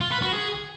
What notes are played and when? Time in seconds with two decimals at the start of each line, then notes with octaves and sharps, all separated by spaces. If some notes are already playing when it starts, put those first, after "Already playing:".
0.01 F4
0.11 B4
0.22 F#4
0.32 G#4